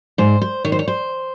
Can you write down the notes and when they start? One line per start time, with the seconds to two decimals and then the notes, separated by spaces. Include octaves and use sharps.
0.18 G#2 C5
0.42 C5
0.64 D#3 C#5
0.72 C5
0.79 C#5
0.88 C5